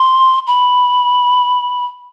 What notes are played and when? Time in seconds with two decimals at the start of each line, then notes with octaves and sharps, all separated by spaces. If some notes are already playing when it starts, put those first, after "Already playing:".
Already playing: C6
0.47 B5